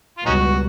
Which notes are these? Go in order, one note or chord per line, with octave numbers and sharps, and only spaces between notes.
F4
C#2 B2 G3 C#4 D#4 F#4